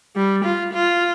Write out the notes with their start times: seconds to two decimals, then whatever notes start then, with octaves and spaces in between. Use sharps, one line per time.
0.16 G3
0.43 F4
0.72 F4